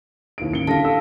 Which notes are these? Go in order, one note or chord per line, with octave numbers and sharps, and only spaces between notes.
D#2 E4 D7
A1 C#7 G7
D3 G4 F5 A5 A#6
E6